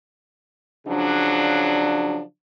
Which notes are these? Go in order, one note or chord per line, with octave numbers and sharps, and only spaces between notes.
C#3 F3 F#3 D4